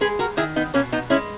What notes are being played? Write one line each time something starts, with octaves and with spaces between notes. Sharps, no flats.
G#3 G#4 B4
F#4 A#4
D#3 E4 G#4
B3 D#4
B2 A#3 C#4
B3 D#4
G#3 C#4 E4